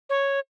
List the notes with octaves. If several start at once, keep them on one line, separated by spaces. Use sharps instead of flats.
C#5